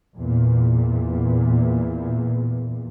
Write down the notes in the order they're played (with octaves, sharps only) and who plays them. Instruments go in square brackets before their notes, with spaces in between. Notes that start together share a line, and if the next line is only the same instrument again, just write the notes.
[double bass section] E2 A#2